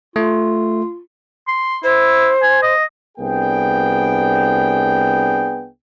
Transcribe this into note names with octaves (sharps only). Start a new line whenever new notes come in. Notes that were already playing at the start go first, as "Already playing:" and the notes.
A3 F4
C6
E4 C5
G#5
D#5
C2 B3 D4 G#4 G5